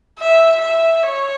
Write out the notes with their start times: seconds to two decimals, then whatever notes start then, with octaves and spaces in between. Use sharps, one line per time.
0.19 E5
0.61 E5
1.03 C#5